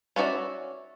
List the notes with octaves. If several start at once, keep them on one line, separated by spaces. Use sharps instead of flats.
C#4 D4 F#4 D5 E5